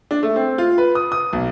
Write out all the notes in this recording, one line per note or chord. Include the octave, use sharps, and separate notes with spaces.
D4
A3
C4
F4
B4
D#6
D#6
B1